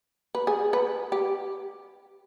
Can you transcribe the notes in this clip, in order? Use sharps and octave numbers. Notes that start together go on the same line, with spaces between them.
B4
G#4
B4
G4